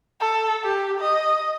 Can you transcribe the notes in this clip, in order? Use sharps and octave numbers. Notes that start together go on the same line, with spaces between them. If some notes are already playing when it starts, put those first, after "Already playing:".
A4
G4
D#5